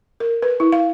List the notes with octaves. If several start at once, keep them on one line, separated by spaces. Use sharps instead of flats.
A#4
B4
E4
F5